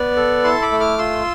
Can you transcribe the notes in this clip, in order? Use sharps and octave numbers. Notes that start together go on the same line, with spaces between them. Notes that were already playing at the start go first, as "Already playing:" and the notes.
Already playing: B3 B4 D5
A4
E4 A5 C6
B5 D6
A3
D6 F6
F4 C6 E6